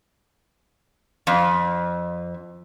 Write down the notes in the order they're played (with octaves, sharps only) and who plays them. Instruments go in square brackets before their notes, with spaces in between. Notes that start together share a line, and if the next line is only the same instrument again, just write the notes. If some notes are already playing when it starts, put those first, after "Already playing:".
[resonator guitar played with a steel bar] F2